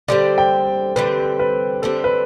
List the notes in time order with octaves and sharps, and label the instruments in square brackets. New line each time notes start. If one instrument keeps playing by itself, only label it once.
[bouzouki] D3 G3 C4 [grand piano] D5
[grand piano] G5
[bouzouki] D3 G3 C4 [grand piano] B4
[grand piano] B4
[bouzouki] D3 G3 C4 [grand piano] A4
[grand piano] B4